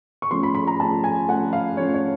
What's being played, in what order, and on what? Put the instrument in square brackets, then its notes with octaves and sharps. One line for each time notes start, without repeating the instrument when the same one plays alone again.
[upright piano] C#6
F3 A3 C#4 C6
B5
B5
A#5
F3 A3 C#4 A5
G#5
F3 A3 C#4 F#5
F5
F3 A3 C#4 C#5
C#5